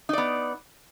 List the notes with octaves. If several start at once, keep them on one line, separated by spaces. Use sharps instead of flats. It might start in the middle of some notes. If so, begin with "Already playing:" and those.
B3 D#4 D5